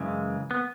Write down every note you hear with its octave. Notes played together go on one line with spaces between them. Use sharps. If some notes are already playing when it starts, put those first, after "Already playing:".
Already playing: F#2 C#3 E3 G#3
B3